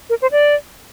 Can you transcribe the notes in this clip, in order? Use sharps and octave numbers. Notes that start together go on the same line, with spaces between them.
A#4
C5
D5